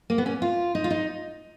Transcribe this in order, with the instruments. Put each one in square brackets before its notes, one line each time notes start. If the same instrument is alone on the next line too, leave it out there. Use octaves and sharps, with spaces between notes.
[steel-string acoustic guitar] A#3
B3
C#4
F4
D#4
F4
D#4